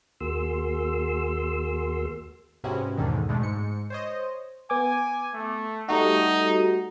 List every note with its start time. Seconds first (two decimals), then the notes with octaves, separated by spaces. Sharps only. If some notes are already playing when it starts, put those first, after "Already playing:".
0.21 D#2 A#3 F#4 G#4 C6 E6
2.64 G#2 C3 B3 C#4 E4 F#4
2.98 E2 G#2 B2 D3 D#3
3.29 B2 G#3 A3 D4
3.42 G#2 C#7
3.90 C5 C#5 D#5
4.70 B3 G#5 D6
5.33 A3
5.89 G3 A3 D#4 F#4